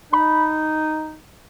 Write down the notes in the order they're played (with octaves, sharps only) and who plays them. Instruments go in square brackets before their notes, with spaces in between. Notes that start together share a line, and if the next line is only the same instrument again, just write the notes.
[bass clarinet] D#4 [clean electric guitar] B5